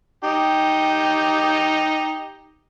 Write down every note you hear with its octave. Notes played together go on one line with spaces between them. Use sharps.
D#4 G4